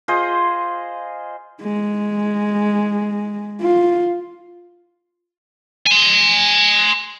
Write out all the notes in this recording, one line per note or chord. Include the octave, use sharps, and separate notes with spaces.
F4 G#4 C5 D#5
G#3
F4
G#5 C6